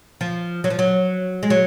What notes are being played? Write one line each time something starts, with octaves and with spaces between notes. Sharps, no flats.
F3
F#3
F3
F#3
G#3
F#3